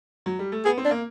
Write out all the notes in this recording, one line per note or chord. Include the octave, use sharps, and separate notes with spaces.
F#3
G3
A3
B3 G#4
C4
D4
A#3